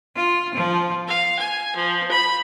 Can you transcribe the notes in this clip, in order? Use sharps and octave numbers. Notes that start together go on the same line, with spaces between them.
F4
F3
F5
G#5
F3
B5